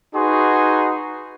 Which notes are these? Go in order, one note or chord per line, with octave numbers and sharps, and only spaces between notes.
D#4 F#4 G#4 B4 C6